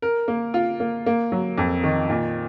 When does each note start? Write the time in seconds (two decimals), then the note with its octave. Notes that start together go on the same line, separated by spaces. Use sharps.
0.02 A#4
0.28 A#3
0.54 F4
0.80 A#3
1.06 A#3
1.32 F#3
1.58 F2
1.83 D#3
2.09 A#2